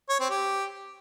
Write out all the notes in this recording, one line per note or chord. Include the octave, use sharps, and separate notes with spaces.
C#5
C4
G4